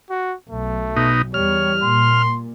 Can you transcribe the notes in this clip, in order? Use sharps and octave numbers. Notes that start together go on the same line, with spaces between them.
F#4
B1 A3
B2 D#4
E2 G3 C#5 F6
A#2 C6